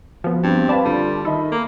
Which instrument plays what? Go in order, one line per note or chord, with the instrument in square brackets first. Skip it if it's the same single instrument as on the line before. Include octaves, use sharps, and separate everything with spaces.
[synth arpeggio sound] F3 B3 [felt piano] F#4
[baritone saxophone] G2 [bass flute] C4
[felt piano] B4 F5 B5 [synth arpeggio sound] D5 A5
[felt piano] D3 [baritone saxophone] G3 [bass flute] F4
[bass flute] D#3 [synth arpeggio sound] A4 [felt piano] D#5 E5 B5
[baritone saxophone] A#3